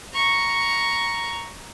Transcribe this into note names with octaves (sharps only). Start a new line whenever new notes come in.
A#5 C#6